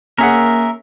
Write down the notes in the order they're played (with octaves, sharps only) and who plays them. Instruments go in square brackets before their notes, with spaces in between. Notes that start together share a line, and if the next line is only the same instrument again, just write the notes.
[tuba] A#3 [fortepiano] C#4 G#4 F#5 [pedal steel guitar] A#4 E5